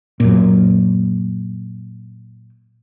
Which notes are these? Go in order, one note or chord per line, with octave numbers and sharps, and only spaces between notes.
F#2 A#2